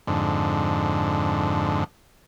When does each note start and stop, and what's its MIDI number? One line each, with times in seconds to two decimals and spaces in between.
0.07 1.84 41
0.07 1.84 44
0.07 1.84 50